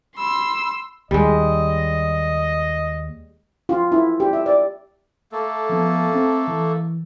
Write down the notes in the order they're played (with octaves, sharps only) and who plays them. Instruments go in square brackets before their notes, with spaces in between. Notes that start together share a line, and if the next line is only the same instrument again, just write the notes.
[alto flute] B5 [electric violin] C6 E6
[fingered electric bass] D#2 [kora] G3 G#3 [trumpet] D#5
[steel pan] F4
E4
G4
E5
D5
[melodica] A3 A#3 A4
[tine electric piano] F3 B3
C4
E3